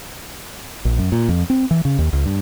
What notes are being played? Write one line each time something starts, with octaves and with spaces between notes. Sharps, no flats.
A#1
F#2
A#2
F2
C4
E3
C#3
D#2
C#2
G2